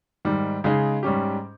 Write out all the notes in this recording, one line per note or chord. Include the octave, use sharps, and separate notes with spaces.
G#2 D#3 G3
C#3 G#3 D#4 G#4
G#2 G3 C#4 G4